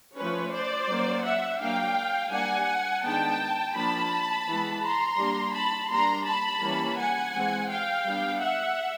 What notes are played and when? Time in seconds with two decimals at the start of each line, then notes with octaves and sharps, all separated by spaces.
0.16 F3 A3 C#4 B4 C#5
0.52 C5 D5
0.88 F#3 A#3 C#4
1.23 E5 F#5
1.60 F#3 A#3 D4 F5 G5
2.31 G3 A#3 D4 F#5 G#5
3.02 D#3 G#3 B3 D4 G5 A5
3.74 F3 A#3 D4 A5 B5
4.46 E3 G#3 B3
4.82 A#5 C6
5.17 G3 A#3 D4
5.53 A5 B5
5.89 G3 A#3 D4 A#5 C6
6.25 A5 B5
6.60 E3 G3 A#3 C#4
6.96 F#5 G#5
7.33 E3 G#3 C4
7.68 F5 G5
8.04 G3 B3 D4
8.39 E5 F#5